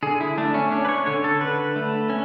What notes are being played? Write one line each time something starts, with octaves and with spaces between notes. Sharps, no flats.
D3 G#4
E4
A3 D4
C#4
C#4 D4
B4
C#5
D3 C#5
A4
D3 B4
A3
C#4